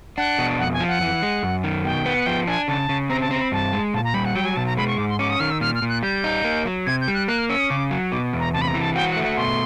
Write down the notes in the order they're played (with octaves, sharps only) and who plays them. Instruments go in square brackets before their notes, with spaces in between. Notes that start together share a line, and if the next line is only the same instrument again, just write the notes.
[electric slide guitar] D4 [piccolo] F#5
[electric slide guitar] B2
[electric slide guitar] F2 [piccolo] F#5
[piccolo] G#5
[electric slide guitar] F3
[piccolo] F#5
[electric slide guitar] E3
G#3
F#2
D#3
[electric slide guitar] B2 [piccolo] G5
[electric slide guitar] B3
[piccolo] F#5
[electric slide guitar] F3 [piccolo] G5
[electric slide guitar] D4 [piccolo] G#5
[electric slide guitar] C#3 [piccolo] A5
[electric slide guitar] C#3
[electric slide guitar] C4 [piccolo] A#5
[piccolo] A5
[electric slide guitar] C4 [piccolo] A#5
[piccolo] B5
[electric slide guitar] G2 [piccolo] A5
[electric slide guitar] G#3
[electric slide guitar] A#2 [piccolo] A5
[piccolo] A#5
[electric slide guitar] G3 [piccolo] B5
[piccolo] F#5
[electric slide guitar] F#3 [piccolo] G5
[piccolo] G#5
[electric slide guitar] B2 [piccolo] A5
[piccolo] A#5
[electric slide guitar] G#3 [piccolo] B5
[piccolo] C#6
[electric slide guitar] G#2 [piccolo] D6
[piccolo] C6
[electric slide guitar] C#4 [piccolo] D6
[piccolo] D#6
[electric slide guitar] D#3 [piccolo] F6
[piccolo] E6
[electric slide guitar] A#2 [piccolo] F6
[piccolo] F6
[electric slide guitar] A#2
[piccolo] F#6
[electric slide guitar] G3 [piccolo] G6
[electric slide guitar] D#4
A#3
F#3
[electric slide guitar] C3 [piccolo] G#6
[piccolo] G6
[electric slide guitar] G3
[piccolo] F#6
[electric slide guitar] A#3 [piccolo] F#6
[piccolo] F6
[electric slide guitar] C#4 [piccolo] E6
[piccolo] D#6
[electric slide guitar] C#3 [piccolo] D6
[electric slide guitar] F#3
[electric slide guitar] B2 [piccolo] D6
[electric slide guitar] E2
[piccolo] A#5
[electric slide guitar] C3 [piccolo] A5
[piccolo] B5
A#5
[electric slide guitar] E3
[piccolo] A5
[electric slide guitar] F#4 [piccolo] G5
[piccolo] F#5
[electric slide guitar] A3
[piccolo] F#5
[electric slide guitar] B2 [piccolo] C6